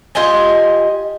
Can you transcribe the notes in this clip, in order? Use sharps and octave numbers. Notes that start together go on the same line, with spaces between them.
F4 G4 D#5 G#5